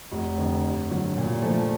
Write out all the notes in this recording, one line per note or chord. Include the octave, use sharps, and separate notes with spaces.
F1
F2 D3
G2
D3 F#3
A#2
F3 A3